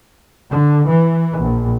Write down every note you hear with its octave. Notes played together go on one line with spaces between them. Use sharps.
D3
E3
A#1